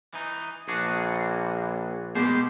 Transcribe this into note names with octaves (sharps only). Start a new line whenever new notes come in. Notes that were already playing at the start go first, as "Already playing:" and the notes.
E3 D#4
A#1 D4 F#4 G#4
B2 G#3 G4 C5